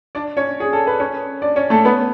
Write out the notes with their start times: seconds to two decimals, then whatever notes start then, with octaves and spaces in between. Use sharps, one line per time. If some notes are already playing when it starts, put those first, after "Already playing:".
0.15 D4 D5
0.37 C#4 C#5
0.60 G#4
0.73 A4
0.87 B4
0.99 C#4 C#5
1.42 D4 D5
1.56 C#4 C#5
1.70 A3 A4
1.85 B3 B4